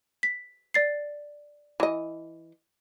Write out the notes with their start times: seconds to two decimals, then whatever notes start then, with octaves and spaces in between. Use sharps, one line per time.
0.23 B6
0.74 D5 A6 C7
1.80 E3 D#5